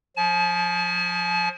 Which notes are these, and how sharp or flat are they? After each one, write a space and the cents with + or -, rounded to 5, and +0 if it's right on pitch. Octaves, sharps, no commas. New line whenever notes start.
F3 +30 A5 -45